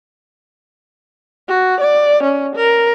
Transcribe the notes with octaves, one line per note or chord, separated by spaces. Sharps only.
F#4
D5
C#4
A#4